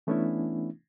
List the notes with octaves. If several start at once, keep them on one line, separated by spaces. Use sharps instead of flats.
E3 A3 B3 C#4 D4 E4